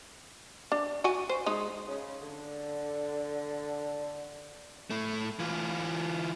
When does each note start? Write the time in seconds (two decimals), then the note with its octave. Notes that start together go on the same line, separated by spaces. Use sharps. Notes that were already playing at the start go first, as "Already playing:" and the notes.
0.72 D4
1.04 F#4 F#5 G#5
1.29 C5
1.46 G#3 D#4
1.88 C#3
2.21 D3
4.90 A2 A3
5.39 E3 F4